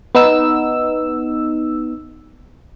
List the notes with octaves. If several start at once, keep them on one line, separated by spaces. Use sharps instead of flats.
B3 D#4 E6